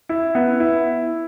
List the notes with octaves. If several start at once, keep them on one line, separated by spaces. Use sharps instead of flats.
E4
B3
E4